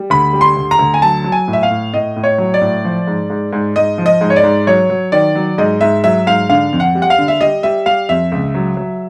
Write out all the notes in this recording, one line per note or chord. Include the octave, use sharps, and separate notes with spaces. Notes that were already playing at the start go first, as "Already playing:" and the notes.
Already playing: G3
D2 B5
G3
C6
D2
A#5
D2
G#5
F#3 A5
F#3
G#5
A2
E5
F5
A2
A2 D#5
A2
C#5
F#3
D5
A2
F3
G#2
G#2
G#2
G#2 D#5
F3
D#5
G#2
C#5
D5
G#2
F#3 C#5
F#3
D#3 D5
F#3
G#2 D#5
G#2 E5
F#3 E5
G#2 F5
D3 F5
F2
F#5
G3
F#5
F5
D3
E5
G3 D#5
G3 E5
G3 F5
F2 E5
C#2
F#3
F#3